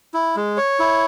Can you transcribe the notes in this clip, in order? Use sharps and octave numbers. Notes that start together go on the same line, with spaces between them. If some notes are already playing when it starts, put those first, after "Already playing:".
E4
G#3
C#5
E4